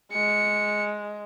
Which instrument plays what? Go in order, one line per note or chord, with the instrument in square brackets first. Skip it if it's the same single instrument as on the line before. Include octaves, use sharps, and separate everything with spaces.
[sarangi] G#3 [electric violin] C#7